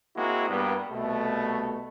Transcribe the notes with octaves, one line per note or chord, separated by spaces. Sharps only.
G#3 A#3 C4 E4 F#4
G2 G3 A#3 B3
C2 B2 A3